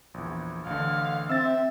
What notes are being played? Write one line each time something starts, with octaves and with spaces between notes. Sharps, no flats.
A#1 E2
A1 D3 F5
C4 E5 E6 A6